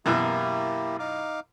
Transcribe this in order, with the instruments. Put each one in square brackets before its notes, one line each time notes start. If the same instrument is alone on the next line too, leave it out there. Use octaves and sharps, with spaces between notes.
[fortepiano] F#2 B2 E3 [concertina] A#3 E4 G4
[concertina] D#4 F5 D6